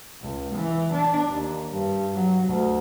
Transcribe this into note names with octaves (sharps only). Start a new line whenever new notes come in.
C#2
E3
D4
D#2
G2
F#3
D2